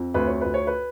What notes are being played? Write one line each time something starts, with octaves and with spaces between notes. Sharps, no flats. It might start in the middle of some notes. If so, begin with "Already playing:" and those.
Already playing: F2
D2 B4
C#5
D2 B4
C#5
B4